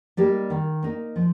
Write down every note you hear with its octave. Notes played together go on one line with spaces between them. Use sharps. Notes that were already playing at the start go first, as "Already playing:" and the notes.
G3 A#3 D#4 G4
D#3
A#3 D#4
F3